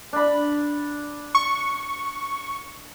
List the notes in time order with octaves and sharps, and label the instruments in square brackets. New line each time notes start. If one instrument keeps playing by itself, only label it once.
[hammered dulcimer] D4 B5
[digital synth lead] C#6